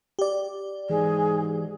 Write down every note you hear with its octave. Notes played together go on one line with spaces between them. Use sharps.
G4 D5
G#2 E3 G#4